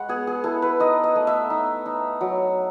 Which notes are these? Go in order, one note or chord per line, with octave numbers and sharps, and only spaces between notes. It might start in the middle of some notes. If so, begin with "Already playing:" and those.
Already playing: G#3 F#5 B5 C#6
B3 G#4
G#4
E4 A4
B4
D#4 D#5
D#5
A3
E5
D#4
D#4
F#3